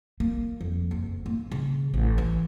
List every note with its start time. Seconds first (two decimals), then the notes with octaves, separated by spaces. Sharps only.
0.20 A#3
0.61 F2
0.91 F#1
1.26 A#3
1.52 C#3
1.94 A1
2.18 E3